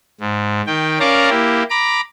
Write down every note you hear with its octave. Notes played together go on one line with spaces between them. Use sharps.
G#2
D#3 G5
C#4 A#4 D5 F5 A5 A#5
A#3 E4 G4
A#5 B5 D6